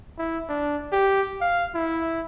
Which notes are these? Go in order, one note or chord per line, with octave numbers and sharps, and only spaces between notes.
E4
D4
G4
F5
E4